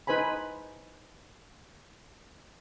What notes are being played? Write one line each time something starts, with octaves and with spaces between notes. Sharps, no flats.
D#4 B4 C5 G#5 B5